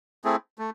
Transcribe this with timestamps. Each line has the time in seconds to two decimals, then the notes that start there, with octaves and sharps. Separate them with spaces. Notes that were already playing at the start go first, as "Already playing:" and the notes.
0.24 A3 C4 E4 G#4
0.59 A3